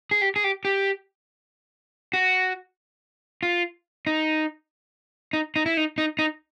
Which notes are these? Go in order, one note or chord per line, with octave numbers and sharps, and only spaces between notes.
G#4
G4
G#4
G4
G4
F#4
F4
D#4
D#4
D#4
E4
D#4
D#4
D#4